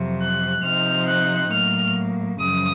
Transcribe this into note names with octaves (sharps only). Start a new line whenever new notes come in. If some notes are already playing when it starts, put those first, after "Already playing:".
Already playing: F2 C3 F#3
F#6
C3 F3 C4 D#4 F6
F#6
A2 F#3 A#3 F6
F#2 C#3 F3 D#6